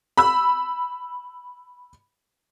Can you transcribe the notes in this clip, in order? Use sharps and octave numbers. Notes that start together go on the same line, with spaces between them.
B5 E6